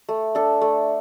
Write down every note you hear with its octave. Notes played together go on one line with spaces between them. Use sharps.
A3
D4 A4
A3